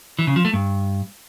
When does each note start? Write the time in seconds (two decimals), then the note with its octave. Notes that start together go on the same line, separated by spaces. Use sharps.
0.19 E3
0.27 C#3
0.36 F3
0.45 A3
0.53 G2